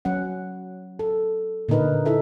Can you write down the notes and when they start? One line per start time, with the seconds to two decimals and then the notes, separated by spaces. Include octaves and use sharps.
0.05 F#3 C#4 F#5
0.99 A4
1.69 A#2 D3 D4 D#4 A#4 B4
2.06 D#4 E4 A4 E5